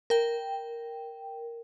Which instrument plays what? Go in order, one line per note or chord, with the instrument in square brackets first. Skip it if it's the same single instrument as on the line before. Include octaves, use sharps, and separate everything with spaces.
[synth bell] A#4 G5